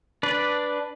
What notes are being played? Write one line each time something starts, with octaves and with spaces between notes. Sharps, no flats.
D4 B4 D5